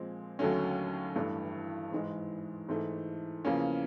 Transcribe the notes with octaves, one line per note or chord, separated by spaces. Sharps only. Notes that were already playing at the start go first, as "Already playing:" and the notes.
Already playing: A#2 F3 G#3 C4
D#2 D3 F#3 A3 C#4
A1 G2 E3 A3 D4
G#2 E3 G#3
G#2 E3 A3
E2 C#3 F3 A#3 C#4